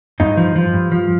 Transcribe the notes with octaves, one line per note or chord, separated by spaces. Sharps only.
G2 D#4
F3
F3
G2
F3